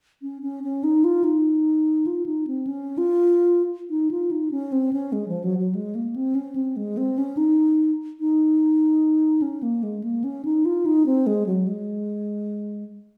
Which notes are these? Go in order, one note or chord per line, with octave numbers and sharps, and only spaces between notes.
C#4
C#4
C#4
D#4
F4
D#4
F4
D#4
C4
C#4
F4
D#4
F4
D#4
C#4
C4
C#4
G#3
F3
F#3
F#3
G#3
A#3
C4
C#4
C4
G#3
C4
C#4
D#4
D#4
C#4
A#3
G#3
A#3
C#4
D#4
F4
D#4
C4
G#3
F#3
G#3